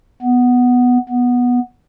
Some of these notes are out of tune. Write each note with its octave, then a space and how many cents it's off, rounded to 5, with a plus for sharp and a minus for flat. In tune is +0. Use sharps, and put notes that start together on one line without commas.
B3 +0
B3 -10